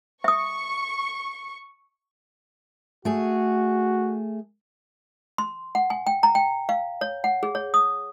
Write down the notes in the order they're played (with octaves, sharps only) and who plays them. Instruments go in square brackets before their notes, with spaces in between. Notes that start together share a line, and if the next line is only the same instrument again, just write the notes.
[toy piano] E5 D#6 [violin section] C#6
[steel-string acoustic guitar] A3 G#4 [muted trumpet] F#4
[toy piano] C6
F#5
G#5
G5
A#5
G5
F5
C#5
F#5
G#4
C#5
D#6